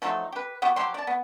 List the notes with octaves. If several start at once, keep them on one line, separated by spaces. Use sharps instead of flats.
F3 F#3 A3 D#4
G4 B4
B3 F#4 G4
F3 F#3 G4 C6
D5 A5
B3